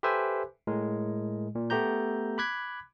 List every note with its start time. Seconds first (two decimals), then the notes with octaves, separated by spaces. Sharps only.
0.03 G4 A4 B4 C5 E5 G#5
0.67 A2 G#3 A#4
1.55 A#2
1.70 A3 B3 G4 A#5 G6
2.38 B5 D6 F#6 G#6 B6